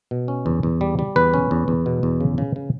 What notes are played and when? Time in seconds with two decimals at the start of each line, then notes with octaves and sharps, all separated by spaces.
0.11 B2
0.28 C#4
0.46 E2
0.63 E2
0.81 G3
0.99 G3
1.16 E2 B4
1.34 C#4
1.51 E2
1.68 E2
1.86 B2
2.03 E2
2.21 C#3
2.38 C#3
2.56 C#3